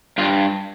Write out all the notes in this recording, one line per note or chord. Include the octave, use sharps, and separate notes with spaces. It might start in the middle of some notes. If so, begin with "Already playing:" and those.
G2 F4